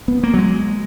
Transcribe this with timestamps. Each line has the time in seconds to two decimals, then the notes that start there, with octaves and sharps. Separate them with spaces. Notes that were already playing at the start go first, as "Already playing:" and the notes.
0.08 B3
0.23 A#3
0.34 F#3
0.39 G#3